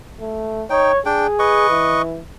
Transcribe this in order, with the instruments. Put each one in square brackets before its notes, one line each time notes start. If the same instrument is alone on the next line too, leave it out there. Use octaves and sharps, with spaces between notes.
[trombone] A3
[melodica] D#4 G5 [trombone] C#5
[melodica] D4 G5 [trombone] G#4
[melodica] B4 D#5 C#6
[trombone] E3